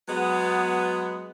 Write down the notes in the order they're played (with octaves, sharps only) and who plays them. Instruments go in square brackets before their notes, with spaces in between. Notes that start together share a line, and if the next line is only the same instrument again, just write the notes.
[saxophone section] F#3 G#3 B3